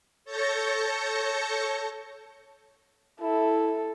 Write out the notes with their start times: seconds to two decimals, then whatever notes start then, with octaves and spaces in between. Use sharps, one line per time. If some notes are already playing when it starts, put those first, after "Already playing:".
0.24 A4 C#5 A5 G6 A#6 C#7
3.21 E4 A4